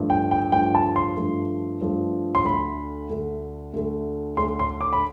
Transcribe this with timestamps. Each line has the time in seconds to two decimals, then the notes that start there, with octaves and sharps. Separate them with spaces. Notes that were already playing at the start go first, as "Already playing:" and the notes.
Already playing: G2 F3 A3
0.10 G5
0.31 G5
0.52 G2 F3 A3 G5
0.75 A5
0.96 C6
1.17 G2 F3 A3
1.81 G2 F3 A3
2.35 C6
2.45 D2 D3 A3 B5
3.10 D2 D3 A3
3.74 D2 D3 A3
4.37 D2 D3 A3 C6
4.59 C6
4.81 D6
4.93 B5